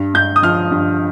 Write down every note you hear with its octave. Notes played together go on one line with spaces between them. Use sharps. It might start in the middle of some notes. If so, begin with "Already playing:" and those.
Already playing: G2
G2 G6
D#6
F3 F6
G2